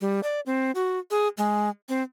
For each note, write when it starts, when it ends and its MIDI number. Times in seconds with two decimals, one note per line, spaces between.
0.01 0.20 55
0.23 0.40 74
0.46 0.71 60
0.75 0.99 66
1.11 1.28 68
1.37 1.69 56
1.89 2.02 60